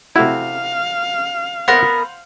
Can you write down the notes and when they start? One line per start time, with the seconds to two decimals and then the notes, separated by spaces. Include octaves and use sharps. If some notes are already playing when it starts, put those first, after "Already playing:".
0.16 C3 A3 E4 F#4 F5
1.68 B3 A#4 C5 F#5